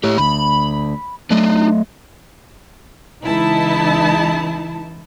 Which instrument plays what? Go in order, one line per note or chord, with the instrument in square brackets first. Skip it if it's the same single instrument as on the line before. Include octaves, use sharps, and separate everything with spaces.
[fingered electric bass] A2 [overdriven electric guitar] G4 C#5
[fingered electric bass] D2 [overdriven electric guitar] B5
[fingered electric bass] F#3 A3 [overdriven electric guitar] D4 D#4
[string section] C#2 E3 D#4 E4 A5